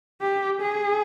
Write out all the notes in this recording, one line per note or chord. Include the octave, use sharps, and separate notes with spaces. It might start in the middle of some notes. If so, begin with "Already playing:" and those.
G4
G#4